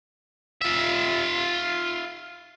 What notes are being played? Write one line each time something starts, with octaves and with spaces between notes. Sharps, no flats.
F4 E5